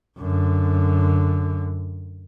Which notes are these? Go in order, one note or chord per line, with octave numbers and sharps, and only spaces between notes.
F#2 D3